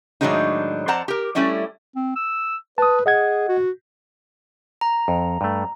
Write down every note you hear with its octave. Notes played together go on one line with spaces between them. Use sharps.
A2 D#3 F#3 G#3 D4 D#4
F2 C5 D5 F#5 A5 A#5
G4 A#4
G3 A3 C#4 E4 D5
C4
E6
B4 A5 D#6
G#4 D#5 F#5 G#6
F#4
A#5
F2
G2 A3